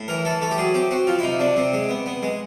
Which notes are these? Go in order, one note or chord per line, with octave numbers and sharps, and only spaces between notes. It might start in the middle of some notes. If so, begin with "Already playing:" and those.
Already playing: A2
E3 A#4
E3 A4
A3 A4
G4
F#3 G#4
C4 G4
C4 F#4
F3 F4
E4
C3 D#4
C3 D4
C3 C4
G#3
B3
B3
G#3